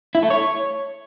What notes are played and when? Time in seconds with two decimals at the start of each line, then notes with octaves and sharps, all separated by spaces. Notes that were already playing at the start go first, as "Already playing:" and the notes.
0.15 E4
0.23 A3
0.30 C#5